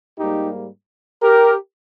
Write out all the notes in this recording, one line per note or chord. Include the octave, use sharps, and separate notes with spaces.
G#2 G3 A#3 D#4 G4
G4 A#4